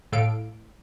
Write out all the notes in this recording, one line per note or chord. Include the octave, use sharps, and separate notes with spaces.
A2 A4 F5 D7